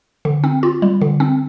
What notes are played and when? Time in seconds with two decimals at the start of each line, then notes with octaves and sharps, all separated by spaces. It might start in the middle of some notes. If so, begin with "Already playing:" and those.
0.25 D3
0.44 C4
0.63 F4
0.82 G3
1.01 D3
1.20 C4